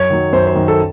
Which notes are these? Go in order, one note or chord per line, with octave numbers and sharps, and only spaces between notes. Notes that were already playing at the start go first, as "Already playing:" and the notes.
Already playing: F#2 C#5
D#3 F#3
F#2 C5
C5
D#3 F#3
A4